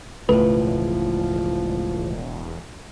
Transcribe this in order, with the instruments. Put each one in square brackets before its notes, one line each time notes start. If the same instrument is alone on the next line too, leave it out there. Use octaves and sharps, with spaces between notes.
[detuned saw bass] E1 [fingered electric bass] C#2 A2 [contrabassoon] F3 [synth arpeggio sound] A3 B4